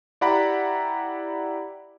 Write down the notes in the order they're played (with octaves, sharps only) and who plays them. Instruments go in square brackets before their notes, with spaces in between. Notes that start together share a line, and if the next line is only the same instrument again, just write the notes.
[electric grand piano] E4 G4 D5 F#5 A#5 B5